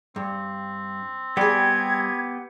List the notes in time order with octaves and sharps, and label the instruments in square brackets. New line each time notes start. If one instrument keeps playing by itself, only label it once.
[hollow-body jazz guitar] G2 [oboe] C4
[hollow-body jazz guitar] G3 G#4 [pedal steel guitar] B3 G4 [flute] G#6